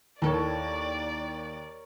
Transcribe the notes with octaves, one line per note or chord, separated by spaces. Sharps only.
D#2 E4 A4 A#4 C#5 D5